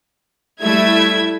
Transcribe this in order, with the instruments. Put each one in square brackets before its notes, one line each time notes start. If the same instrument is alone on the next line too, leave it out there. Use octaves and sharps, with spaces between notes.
[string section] G3 A3 E4 E5 G#6